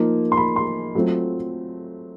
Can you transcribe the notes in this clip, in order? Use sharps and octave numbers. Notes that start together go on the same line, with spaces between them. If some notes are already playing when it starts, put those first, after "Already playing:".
Already playing: F3 A#3 D#4
C6
B5
C6
F#3 A3 C4 F4